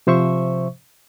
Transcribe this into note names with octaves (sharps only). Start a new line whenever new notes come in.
C3 F3 C5 E5 C#6